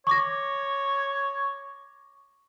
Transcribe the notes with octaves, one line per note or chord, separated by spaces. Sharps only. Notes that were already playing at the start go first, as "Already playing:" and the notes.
C#5 C#6 D6 A#6